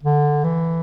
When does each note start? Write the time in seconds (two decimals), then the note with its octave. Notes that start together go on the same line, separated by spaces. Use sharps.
0.03 D3
0.44 E3